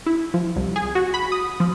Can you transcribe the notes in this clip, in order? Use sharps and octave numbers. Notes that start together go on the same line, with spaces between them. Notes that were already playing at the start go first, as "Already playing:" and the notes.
E4
F3
C2
G#4
F#4
B5
D#6
F3